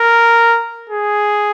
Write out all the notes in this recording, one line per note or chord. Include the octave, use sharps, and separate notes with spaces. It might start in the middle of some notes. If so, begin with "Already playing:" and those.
Already playing: A#4
G#4